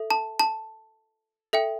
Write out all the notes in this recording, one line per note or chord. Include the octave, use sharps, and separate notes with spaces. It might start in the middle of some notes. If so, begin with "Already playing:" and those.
Already playing: A4 E5
A5
A5
A4 E5 G5